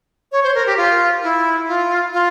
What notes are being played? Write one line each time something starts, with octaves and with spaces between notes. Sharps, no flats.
C#5
C5
A#4
G4
F4
E4
F4
F4